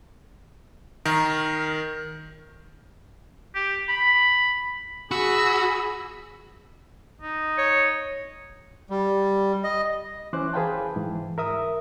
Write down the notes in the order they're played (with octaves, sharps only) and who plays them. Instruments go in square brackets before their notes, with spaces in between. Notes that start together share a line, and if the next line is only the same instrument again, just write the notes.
[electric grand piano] D#3 A#4
[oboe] G4
B5
[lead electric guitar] F#4 [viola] G#4 [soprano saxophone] B5 [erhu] E6
[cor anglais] D#4
[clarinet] C#5
[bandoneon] G3
D#5
[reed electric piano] E3 C#4 C5 D6 F#6
G#4 B4 C5 F5 G5 A5
G#2 E3
A#4 E5 D#6